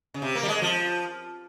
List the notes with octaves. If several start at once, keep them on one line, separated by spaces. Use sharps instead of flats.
C#3
C3
A#3
G3
G#3
F3